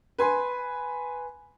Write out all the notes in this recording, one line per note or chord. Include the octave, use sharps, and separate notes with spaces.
B4 G#5 C6